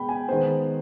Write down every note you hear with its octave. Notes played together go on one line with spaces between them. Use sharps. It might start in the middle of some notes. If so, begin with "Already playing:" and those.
Already playing: B2 G#3 B3 G5 B5
G#5
D#3 G#3 B3 C5